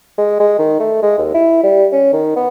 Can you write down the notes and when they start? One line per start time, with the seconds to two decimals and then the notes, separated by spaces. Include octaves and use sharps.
0.18 G#3
0.40 G#3
0.59 D#3
0.80 A3
1.02 G#3
1.18 D#2
1.34 E4
1.63 G3
1.93 C#4
2.13 D#3
2.36 B3